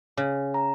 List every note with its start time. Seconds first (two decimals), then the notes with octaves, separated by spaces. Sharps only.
0.17 C#3
0.54 A#5